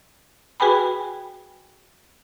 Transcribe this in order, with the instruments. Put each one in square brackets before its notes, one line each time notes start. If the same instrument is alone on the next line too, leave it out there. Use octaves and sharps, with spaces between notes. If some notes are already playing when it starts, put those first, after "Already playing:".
[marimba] F#4 G#4 B4 G5 G#5 B5